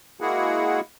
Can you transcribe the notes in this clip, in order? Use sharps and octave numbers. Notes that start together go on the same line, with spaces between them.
G#3 A#3 E4 F#4 G#4 F#5